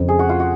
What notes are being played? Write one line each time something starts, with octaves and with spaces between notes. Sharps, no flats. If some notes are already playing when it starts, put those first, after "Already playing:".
Already playing: F2 C#3 F3
G#4
F#4
F4
F#4